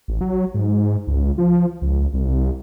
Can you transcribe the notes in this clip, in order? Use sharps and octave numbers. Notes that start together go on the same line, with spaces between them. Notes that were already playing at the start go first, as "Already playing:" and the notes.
A1
F#3
G#2
C#2
F3
C#2
C2